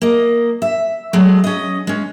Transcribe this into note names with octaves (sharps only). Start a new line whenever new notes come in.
A#3 D#5
E5
F#3 G#3 A3
C#4 D#5
G#3 C#4